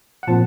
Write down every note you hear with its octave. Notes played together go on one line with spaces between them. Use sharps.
F#5
A#2 F3 C4 A5